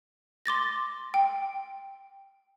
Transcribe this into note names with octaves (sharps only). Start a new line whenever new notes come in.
C6 D6 A6 A#6
G5